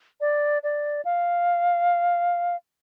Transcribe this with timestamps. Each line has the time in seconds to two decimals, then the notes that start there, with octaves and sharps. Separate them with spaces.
0.21 D5
0.63 D5
1.05 F5